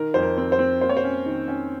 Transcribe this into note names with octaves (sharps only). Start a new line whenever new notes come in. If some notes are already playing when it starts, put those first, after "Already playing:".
Already playing: D#3 A#4
F2 C5
A#4
C4
C5
C4
A#3 C5
C#5
C5
C#4
D#3
C#4